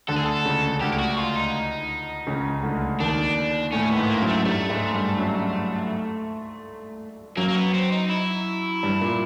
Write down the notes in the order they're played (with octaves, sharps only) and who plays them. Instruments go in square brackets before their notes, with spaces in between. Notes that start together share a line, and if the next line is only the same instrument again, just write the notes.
[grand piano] D2 D3 [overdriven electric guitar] A4
[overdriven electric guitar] G#4
A4
[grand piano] C#2 C#3
[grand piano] D2 D3 [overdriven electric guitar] G4
[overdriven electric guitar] G4
F#4
F4
D#4
[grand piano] C#2 C#3
D2 D3
[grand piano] D#2 D#3 [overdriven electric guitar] D4
[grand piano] A2 A3 [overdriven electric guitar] C#4
[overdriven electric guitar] B3
[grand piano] G#2 G#3
[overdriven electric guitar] A#3
[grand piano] F#2 F#3
[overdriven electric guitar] A3
[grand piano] G2 G3 [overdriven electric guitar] A3
[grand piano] G#2 G#3
G2 G3
F#2 F#3
[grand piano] F#2 F#3 [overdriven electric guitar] A#3
[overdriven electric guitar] A#3
B3
C4
D#4
E4
[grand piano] G2 G3
A#2 A#3